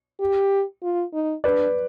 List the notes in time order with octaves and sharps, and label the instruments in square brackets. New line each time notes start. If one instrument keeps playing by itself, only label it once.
[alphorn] G4
F4
D#4
[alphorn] D4 [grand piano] B4 D5